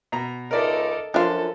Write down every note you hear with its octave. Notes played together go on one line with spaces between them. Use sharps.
B2 A#5
C#2 D#4 A4 A#4 D5 E5
F#2 F3 D4 F4 A4